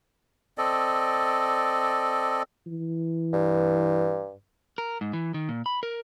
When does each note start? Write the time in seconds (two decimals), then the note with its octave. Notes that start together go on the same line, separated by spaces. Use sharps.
0.58 C4 A4 D5 D#5
2.67 E3
3.33 G2
4.78 A#4
5.01 G#2
5.13 E3
5.34 D#3
5.49 A#2
5.66 B5
5.83 A#4